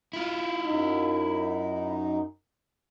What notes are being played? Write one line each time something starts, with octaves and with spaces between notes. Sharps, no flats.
E4 F4
F#2 D#4